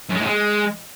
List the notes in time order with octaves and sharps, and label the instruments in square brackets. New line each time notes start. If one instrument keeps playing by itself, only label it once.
[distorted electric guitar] F#2
G#3
A2
G#3